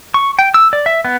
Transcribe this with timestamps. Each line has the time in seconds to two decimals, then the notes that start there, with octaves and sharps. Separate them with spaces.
0.14 C#6
0.39 G5
0.54 E6
0.73 D5
0.86 E5
1.05 B3